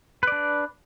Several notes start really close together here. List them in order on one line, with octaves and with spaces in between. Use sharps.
B4 D5 D4